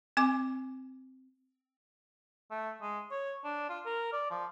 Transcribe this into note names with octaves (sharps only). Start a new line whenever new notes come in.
C4 G#5 D6
A3
G#3
C#5
D4
F4
A#4
D5
F3